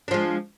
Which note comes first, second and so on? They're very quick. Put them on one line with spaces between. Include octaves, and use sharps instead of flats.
D4 F3 G#3